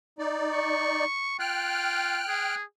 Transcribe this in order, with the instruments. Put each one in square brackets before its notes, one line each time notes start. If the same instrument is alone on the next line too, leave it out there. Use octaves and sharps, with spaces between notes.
[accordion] D#4 D5
[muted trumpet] C#6
[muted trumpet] F4 [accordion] G5 F6 F#6
[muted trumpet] G#4